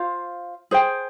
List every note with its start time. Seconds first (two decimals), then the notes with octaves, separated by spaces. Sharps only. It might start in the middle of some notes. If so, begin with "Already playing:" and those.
Already playing: F4 C5 F5
0.71 G#4 C5 G5